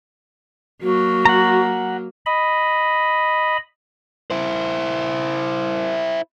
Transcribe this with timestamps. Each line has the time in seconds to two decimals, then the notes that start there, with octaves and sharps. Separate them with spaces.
0.82 F#3 A#3 F#4
1.25 F#5 A#5
2.26 D#5 B5
4.31 E4 C5